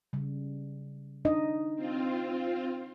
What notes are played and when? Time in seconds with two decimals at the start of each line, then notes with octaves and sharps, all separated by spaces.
0.13 C#3 G3
1.25 D4 D#4 D#5
1.76 C4 F4